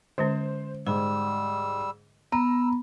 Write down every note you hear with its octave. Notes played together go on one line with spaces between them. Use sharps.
D3 G#3 C#4 C5
G#2 G3 C5 E6
B3 A#5 E6